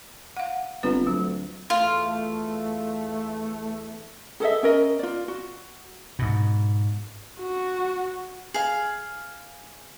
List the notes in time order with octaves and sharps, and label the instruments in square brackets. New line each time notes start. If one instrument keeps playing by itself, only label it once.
[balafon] F5 F#5
[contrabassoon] G1 [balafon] C4 F4 B4
[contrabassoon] D2 [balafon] F#3
[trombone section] E2 A3 [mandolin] F4
[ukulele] G#4 A4 D#5 E5
C#4 A#4 D#5
F4 D5
F#4
[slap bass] G#2 B2
[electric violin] F#4
[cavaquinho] G#4 F5